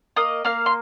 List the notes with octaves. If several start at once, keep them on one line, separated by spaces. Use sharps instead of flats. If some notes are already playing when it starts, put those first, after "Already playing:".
A#3 D#5 D#6
A#3 F5 F6
C6